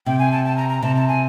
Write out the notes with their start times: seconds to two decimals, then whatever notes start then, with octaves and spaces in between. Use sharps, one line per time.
0.06 C3 G5
0.19 G#5
0.32 A5
0.45 A5
0.57 A#5
0.69 A#5
0.82 C3 A5
0.96 A5
1.08 G#5